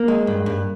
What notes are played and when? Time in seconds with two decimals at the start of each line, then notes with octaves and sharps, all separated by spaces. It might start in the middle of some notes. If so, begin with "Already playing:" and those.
Already playing: A#3
0.08 G#3
0.27 G2
0.46 G2